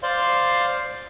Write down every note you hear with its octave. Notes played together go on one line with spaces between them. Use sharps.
C5 D5 F5 C6